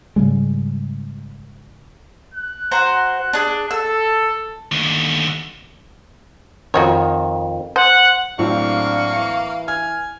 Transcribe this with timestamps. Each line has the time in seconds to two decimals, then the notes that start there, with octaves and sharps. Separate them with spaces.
0.16 G#2 C#3 G3 G#3
2.34 F#6
2.71 F#4 C5 A#5
3.33 D4 G#4
3.71 A4 E6
4.72 D#2 D3
6.74 F2 D#3 F#3 F#4 C#5
7.76 C5 F#5
8.39 A2 F#3 A#3 C4 D4 F5 C#6
9.16 E3
9.68 G#5 F6